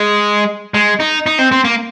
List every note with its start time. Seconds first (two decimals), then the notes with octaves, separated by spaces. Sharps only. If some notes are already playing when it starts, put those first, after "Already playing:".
Already playing: G#3
0.74 G#3
1.00 D#4
1.26 D#4
1.39 C4
1.52 C4
1.65 A#3